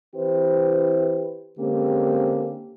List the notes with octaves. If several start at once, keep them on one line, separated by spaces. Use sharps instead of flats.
E3 C4 E4 G4 B4 C5
D3 G#3 A#3 C4 C#4 G4